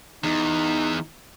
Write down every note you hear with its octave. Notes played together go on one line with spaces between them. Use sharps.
E2 D#4